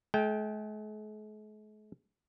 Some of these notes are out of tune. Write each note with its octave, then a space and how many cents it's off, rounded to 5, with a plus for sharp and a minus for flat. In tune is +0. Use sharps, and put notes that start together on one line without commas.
G#3 +45 G5 +0